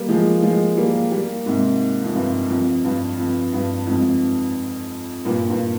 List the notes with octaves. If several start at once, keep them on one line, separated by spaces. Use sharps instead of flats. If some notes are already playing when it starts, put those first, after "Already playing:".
Already playing: G3 A#3
F3 G#3
F3 G#3
G3 A#3
G3 A#3
G#2 C3
F2
G2
F2
G2
F2
G2
F2 G#2
G2 A#2
G2